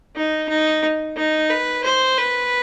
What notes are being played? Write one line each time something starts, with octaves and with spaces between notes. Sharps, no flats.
D#4
D#4
D#4
B4
C5
B4